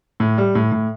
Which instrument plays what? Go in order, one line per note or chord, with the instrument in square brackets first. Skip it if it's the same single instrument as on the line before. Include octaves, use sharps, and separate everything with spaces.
[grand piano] A2
G3
A2
A2